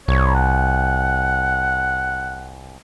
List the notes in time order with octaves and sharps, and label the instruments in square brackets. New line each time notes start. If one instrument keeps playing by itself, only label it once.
[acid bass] C2 [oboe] C#5
[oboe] F#5